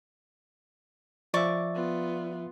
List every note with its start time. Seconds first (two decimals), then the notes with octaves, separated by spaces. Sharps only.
1.34 F3 D5 E5 C#6 D6
1.75 B3 F4